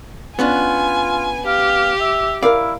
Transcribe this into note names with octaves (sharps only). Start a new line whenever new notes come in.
B3 C#4 D4 F4 G#5
G4 F5
E5
E4 A#4 D5 F5